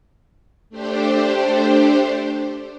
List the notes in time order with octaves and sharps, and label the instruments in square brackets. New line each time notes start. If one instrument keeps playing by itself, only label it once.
[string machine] A3 D4 G4 C5